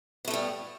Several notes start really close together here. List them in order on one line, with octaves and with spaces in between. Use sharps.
B3 A3 A2 G3